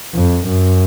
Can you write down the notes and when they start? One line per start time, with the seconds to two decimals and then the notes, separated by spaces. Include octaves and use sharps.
0.14 F2
0.46 F#2